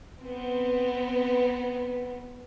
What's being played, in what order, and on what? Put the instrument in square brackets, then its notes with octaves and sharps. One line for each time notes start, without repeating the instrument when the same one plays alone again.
[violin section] B3 C4